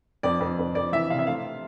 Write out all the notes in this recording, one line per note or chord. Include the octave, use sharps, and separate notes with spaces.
F2 D5
F2
F2
F2 D5
E3 E5
C3 F5
E5
A3 F5